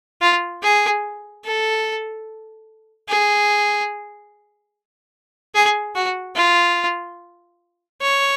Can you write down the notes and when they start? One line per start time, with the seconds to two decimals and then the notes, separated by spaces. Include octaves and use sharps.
0.21 F4
0.63 G#4
1.45 A4
3.08 G#4
5.55 G#4
5.95 F#4
6.36 F4
8.01 C#5